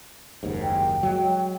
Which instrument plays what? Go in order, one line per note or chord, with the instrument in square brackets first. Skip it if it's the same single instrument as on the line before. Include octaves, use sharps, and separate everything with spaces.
[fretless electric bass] F#1 D#2 G#2
[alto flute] G5
[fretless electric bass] F#3 G#3